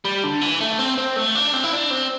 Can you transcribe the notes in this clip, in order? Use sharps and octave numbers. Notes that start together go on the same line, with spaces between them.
G3
D3
E3
A3
C4
C4
A3
D4
C4
E4
D4
C4